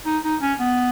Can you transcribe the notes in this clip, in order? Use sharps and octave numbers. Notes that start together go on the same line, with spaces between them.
D#4
D#4
C#4
B3